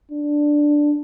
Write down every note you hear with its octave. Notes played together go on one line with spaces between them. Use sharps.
D4